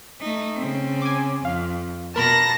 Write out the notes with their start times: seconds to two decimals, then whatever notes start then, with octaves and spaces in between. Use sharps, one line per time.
0.21 A3 D#4
0.56 C#3 C4
1.02 G#5 D6
1.45 F2 F5
2.16 B2 A#4 A5 B5 A#6